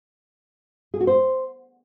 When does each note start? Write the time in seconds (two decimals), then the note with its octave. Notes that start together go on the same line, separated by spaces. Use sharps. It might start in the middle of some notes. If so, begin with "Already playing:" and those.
0.94 G#4
1.00 F#4
1.07 C5